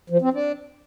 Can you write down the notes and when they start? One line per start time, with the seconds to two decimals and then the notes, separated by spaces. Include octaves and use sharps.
0.10 F3
0.22 C4
0.33 D4